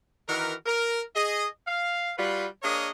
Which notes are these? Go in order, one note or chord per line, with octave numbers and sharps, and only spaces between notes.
D#3 E3 F#4 A#4
A#4
G#4 D#5
F5
G3 F4 F#4 B4
A#3 D4 G#4 A#4 C#5 D#5